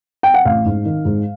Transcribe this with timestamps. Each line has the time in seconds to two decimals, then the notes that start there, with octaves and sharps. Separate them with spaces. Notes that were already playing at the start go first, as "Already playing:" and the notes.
0.23 G5
0.34 F#5
0.45 A1 F5
0.65 G#2
0.85 D#3
1.05 G#2